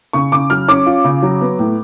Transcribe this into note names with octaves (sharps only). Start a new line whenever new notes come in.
C#3 C#6
C#3 D6
F#3 F6
C#4 D6
F4
C#3
F#3
B3
A2